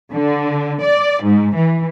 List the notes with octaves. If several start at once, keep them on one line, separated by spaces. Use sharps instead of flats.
D3
D5
G#2
E3